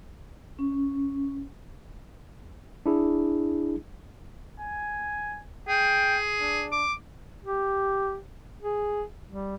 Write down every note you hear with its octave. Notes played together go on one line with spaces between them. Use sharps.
C#4
D4 E4 G#4
G#5
G#4 G5
D4
D6
G4
G#4
G3